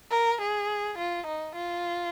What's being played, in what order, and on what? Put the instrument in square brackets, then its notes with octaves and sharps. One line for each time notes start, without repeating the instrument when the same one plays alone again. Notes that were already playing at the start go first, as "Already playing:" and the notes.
[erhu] A#4
G#4
F4
D#4
F4